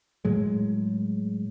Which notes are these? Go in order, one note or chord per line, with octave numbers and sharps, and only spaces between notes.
A2 F#3 G#3